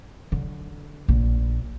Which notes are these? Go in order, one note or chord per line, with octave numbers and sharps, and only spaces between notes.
D3 F#3
A#1